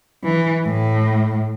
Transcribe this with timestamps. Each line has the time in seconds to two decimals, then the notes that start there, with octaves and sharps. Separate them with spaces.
0.24 E3
0.66 A2